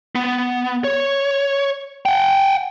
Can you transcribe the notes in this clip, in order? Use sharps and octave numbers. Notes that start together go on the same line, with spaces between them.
B3
C#5
F#5 G5